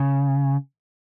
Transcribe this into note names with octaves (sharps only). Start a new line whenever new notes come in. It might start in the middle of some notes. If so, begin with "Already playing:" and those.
Already playing: C#3